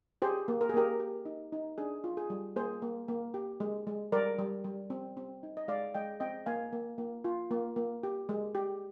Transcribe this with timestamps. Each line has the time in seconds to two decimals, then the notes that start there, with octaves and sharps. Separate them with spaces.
0.22 G4 G#4 C5
0.48 A#3
0.61 A#4
0.69 G#4
0.74 A#3 G4 A#4
1.00 G4
1.25 D#4
1.53 D#4
1.78 D4 G#4
2.04 F4
2.17 G#4
2.30 G3
2.56 A#3 G#4 C5
2.82 A#3
3.08 A#3
3.34 G4
3.60 G#3
3.87 G#3
4.12 G3 A#4 D5
4.39 G3
4.64 G3
4.90 C4
5.17 C4
5.43 D#4
5.57 D#5
5.68 G#3 D5 F5
5.94 G#3 D#5 G5
6.20 C4 D#5 G5
6.46 A#3 F5 G#5
6.73 A#3
6.98 A#3
7.25 F4
7.51 A#3
7.76 A#3
8.03 G4
8.29 G#3
8.55 G4